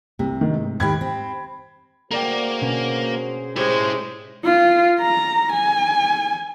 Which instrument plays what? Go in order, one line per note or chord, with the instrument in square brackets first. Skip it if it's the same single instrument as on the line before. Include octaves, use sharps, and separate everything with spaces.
[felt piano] C2 [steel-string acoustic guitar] C3
[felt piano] D#3
G#2
[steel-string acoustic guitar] G#2 D#3 G4 [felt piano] B5 G#6
[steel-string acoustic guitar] C4
[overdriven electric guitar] A#3 [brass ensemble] F#4 G#4 C5 [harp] A#4 D5 G5
[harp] B2 C#4
[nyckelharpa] G#3 [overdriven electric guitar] E4 C#5 [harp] G4 [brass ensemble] C5
[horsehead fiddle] F4
A#5
G#5